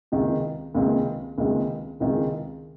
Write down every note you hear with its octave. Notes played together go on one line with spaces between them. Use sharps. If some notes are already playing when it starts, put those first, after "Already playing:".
C#2 C3 D#3 G#3
C#2 C3 D#3 G#3
C#2 C3 D#3 G#3
C#2 C3 D#3 G#3